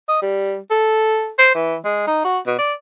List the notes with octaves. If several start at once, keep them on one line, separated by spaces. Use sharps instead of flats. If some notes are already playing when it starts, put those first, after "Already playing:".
D#5
G3
A4
C5
E3
G#3
D#4
F#4
B2
D5